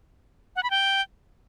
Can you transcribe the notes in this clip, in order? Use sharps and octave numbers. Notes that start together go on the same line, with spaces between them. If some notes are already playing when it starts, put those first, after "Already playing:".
F#5
B5
G5